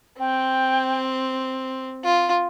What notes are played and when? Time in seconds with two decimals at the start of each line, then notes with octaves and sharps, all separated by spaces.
0.19 C4 G5
2.04 F4